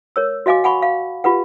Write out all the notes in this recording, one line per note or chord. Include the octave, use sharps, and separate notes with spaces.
A#4 C#5 E6
F#4 D#5 F5 G#5 D6
F#5 G#5 B5 C#6
F5
F4 G4 B4 F#5